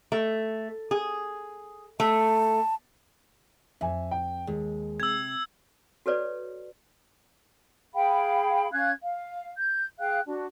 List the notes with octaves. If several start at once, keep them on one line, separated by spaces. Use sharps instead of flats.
A3
G#4
A3 A5
F2 E5 G#5
G5
D#2 G#3
C3 E6 G#6
F#4 A4 B4 C#5 D5
G#4 F5 G5 B5
C#4 F5 F#6 G#6
F5
G6
G#4 F5 G5 F#6
D4 F#4